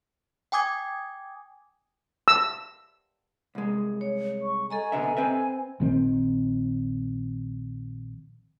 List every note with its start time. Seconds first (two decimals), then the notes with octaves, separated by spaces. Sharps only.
0.52 G5 G#5 D6 D#6 G#6
2.28 E6
3.55 C2 G#3
4.01 C#5
4.42 C#6
4.70 A4 D#5 G#5 A#5
4.92 B2 D3 E5
5.17 C4 B4 E5
5.80 A#1 D#3 C4